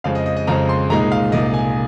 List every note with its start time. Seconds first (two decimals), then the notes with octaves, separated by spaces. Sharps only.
0.04 F2 C#3 G#3 C4 F5
0.15 D#5
0.26 D#5
0.37 D#5
0.47 F2 C#3 G#3 C4 A#5
0.69 C6
0.90 C2 A#2 G#3 D#4 A#5
1.12 F5
1.32 C2 A#2 G#3 D#4 D#5
1.54 G#5